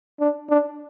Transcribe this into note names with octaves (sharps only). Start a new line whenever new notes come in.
D4
D4